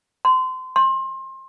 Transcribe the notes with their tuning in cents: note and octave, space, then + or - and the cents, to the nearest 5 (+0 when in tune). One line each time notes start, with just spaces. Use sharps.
C6 -30
C6 +30